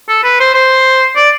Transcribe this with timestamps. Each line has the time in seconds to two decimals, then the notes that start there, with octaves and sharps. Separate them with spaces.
0.08 A4
0.24 B4
0.40 C5
0.54 C5
1.15 D5